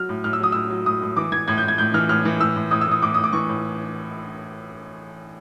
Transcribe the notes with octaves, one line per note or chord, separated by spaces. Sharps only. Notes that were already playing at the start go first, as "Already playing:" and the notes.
Already playing: F#3 F6
A2
A2 F6
E6
F#3 D#6
A2 E6
F#3
A2 D#6
A2
E3 D6
E3 G#6
A2 G#6
G6
A2 G#6
A2 G6
E3 F6
A2 F6
E3
A2 E6
A2
A2 D#6
E6
A2 D#6
A2 D6
A2 D#6
D6
E3 C#6
A2